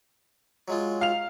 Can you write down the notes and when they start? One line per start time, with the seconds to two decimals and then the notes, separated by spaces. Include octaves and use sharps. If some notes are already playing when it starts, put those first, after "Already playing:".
0.68 F#3 G#3 F4
1.01 F5 F7